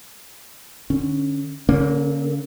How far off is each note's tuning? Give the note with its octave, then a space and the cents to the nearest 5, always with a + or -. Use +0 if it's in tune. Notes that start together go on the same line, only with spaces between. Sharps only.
D3 +20 C#4 +0
D3 -35 A#3 +0 C#4 -5